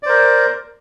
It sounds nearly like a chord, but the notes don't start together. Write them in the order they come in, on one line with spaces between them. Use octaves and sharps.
D5 C5 A#4